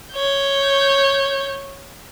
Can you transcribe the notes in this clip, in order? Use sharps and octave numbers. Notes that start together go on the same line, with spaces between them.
C#5 G6